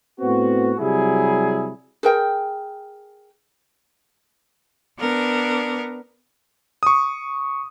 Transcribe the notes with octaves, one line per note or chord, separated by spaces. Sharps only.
A2 B3 C4 F#4
C3 F#3 G3 E4 G#4
G#4 A#4 G5
B3 D4 A#4
C#6 D#6